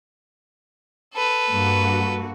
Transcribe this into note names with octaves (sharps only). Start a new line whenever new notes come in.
A4 B4
G2 A#3 F#4